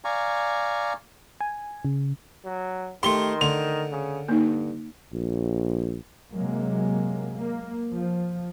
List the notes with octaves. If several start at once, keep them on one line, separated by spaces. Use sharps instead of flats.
D5 F5 G#5 A#5 C#6
G#5
C#3
F#3
D#3 A3 G4 C6 G7
D3 A3 F7
C#3
G2 A#3 D#4
A#1
C3 F#3 G#3 A#3
A#3
F3